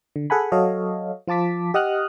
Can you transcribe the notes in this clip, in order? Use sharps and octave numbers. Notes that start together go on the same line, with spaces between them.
D3
G#4 A4 F#5 G#5 B5
F#3 F#4 A4 C#5 D#5 F5
F3 F4 A5 D6 B6
G4 D#5 F#5 D#6 F6 F#6